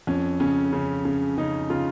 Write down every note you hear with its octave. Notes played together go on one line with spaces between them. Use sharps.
F2 C#4
C#3 C#4
C#3
C#3
C#3 D#4
C#3 F4